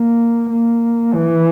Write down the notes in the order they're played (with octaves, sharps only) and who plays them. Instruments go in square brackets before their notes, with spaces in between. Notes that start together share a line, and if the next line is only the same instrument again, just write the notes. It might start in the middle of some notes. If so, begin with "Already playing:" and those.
Already playing: [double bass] A#3
A#3
E3